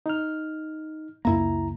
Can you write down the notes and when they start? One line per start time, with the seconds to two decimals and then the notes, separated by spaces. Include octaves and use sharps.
0.06 D#4 F6
1.25 C#2 F#2 A#3 E4 A#5